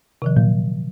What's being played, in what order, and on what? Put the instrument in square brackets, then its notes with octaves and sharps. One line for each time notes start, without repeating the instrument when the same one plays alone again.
[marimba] C3 D#3 F3
[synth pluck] A#2 [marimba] F#3